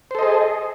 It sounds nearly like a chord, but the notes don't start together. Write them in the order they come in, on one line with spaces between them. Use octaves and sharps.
C5 A4 D#5 G#4